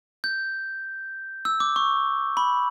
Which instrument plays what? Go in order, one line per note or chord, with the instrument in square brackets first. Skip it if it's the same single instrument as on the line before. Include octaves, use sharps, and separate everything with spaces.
[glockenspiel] G6
E6
D6
C#6
B5